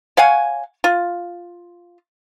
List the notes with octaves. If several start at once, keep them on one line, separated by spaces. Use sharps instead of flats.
C#5 F5 F#5 G#5
F4